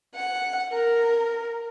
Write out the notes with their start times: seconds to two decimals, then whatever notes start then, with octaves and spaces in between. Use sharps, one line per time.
0.14 F#5
0.73 A#4